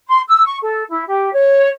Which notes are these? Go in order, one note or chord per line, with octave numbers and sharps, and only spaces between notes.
C6
E6
C#6
A4
E4
G4
C#5